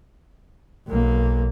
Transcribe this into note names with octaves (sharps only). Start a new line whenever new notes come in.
B1 A#3